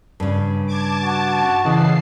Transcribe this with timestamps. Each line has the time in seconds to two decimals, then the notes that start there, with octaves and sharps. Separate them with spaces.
0.20 G2 C#3
0.68 A5 D6 G#6
1.03 F#4
1.64 C#3 E3 D#5 F#5 C7